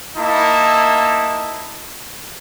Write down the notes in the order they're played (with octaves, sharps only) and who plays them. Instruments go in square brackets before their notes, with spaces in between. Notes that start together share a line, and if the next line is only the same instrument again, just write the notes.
[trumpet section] A#3 D#4 E4 A5